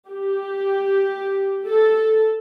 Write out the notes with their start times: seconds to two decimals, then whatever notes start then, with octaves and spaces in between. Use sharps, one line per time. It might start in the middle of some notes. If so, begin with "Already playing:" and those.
0.10 G4
1.69 A4